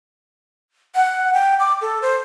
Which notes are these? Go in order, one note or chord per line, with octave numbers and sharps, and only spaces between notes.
F#5
G5
D6
A4
C5